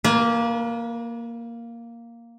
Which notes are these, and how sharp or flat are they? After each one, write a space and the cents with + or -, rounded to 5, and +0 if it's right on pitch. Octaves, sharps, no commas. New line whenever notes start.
A#3 +0 B4 -35 G#5 +45